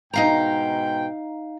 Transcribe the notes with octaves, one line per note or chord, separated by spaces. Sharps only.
G#2 B2 D#4 F5 G5 A#5